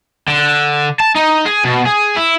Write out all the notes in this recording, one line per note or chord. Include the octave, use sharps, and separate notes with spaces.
D3
A5
D#4
G#4
B2
G#4
E4